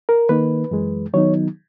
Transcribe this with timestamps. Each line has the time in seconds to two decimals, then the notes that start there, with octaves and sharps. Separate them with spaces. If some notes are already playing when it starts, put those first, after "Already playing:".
0.09 A#4
0.29 D#3 A#3 D#4 B4
0.71 F#2 E3 G#3
1.14 D#3 F#3 B3 D#4 C#5